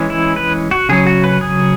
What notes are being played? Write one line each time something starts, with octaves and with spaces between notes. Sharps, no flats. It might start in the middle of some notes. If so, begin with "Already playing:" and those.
Already playing: E3 G#3 C#4
E4
B4
F#4
C#3 F#3 C#4 G#4
F#4
B4
G#4